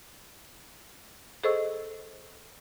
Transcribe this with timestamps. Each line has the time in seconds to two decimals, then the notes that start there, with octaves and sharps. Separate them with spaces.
1.44 G#4 A4 C5 D#5 C#6 E6